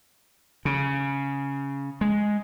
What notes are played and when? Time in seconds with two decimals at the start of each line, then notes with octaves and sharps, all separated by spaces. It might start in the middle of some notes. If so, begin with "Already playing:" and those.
0.65 C#3
2.01 G#3